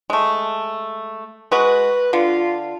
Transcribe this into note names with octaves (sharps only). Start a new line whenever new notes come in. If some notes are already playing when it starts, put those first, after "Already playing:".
G#3 A3
G#3 F#4 B4
D3 F4